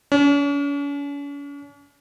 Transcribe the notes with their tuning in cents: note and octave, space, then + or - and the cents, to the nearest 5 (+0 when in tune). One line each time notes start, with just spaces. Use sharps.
C#4 +45